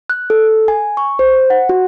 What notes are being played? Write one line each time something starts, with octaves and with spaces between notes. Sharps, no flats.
F#6
A4
G#5
C#6
C5
F#5
F#4